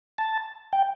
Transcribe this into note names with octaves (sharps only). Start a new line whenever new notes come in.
A5
G5